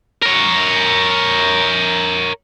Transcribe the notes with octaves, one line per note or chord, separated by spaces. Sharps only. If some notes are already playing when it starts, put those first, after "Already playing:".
A#4 C#5